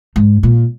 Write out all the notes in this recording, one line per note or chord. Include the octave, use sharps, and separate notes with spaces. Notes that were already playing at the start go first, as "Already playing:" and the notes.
G#2
A#2